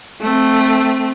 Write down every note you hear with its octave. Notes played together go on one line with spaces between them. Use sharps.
A3 C4